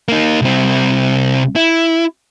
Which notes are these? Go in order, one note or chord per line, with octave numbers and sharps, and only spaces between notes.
A#3 D#4
C2 C4
E4